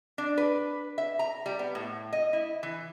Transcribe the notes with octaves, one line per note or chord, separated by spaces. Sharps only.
D4
B4
E5
A#5
G3
B3
A2
D#5
E4
E3